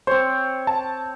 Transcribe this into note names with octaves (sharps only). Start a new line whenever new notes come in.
C4 C5 C#5
A5